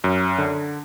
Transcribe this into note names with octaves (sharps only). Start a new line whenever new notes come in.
F#2
D3